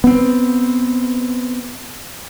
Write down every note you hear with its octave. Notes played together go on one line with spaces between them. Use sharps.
B3 C4